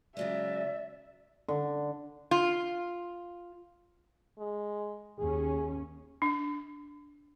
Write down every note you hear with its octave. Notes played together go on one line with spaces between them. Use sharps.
C#3 F#3 G#3 D5 E5
D3
F4
G#3
D#2 C#4 G#4
D4